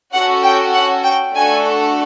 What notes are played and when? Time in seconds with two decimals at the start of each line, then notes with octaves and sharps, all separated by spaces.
0.13 C#4 F#4 A4 F#5
0.43 G5
0.73 F#5
1.04 G5
1.35 A3 D4 F#4 A4 G#5